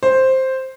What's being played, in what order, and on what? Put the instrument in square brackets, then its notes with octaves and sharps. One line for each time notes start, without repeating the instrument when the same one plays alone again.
[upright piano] C5